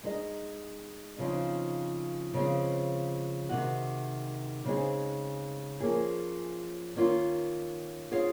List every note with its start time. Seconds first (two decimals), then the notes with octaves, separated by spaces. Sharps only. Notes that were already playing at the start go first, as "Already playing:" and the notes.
0.03 G#3 D#4 G#4 D#5
1.18 C#3 F3 C4 D#4
2.34 C#3 F3 G#3 C4
3.49 C3 D#3 G#3 D#4 F#4
4.65 C#3 G#3 C4 D#4 G#4
5.80 F3 A#3 C#4 G#4
6.95 D#3 A#3 C#4 F4
8.11 C4 F4 G#4 C#5 F5